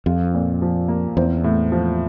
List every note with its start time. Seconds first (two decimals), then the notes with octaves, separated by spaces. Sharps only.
0.06 F2 F4
0.34 A#2
0.62 F3
0.88 A#3
1.17 E2 C4
1.44 A2
1.72 F3